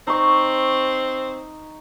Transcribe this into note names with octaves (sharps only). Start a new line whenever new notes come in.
C4 D#4 C#6